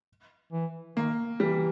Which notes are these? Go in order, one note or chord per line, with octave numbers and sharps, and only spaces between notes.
E3
D#3 A#3
E3 G3